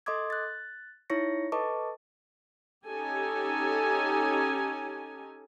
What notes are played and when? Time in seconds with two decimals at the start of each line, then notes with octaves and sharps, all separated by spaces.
0.06 A4 D#5 C6 D6 D#6 G#6
0.30 F#6 A6
1.10 D#4 E4 C#5 C#6 A#6 C#7
1.52 A4 B4 D#5 A5 C#6 D6
2.88 C#4 D#4 G4 A4 G#5